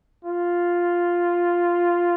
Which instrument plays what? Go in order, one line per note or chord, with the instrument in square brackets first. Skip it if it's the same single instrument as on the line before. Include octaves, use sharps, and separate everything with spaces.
[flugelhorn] F4